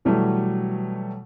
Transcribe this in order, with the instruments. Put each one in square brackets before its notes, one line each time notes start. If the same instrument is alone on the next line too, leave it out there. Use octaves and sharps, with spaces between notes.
[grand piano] B2 E3 F#3 G3 A3